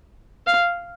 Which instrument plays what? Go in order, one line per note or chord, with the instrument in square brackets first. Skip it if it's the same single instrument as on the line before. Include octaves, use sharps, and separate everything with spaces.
[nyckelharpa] F5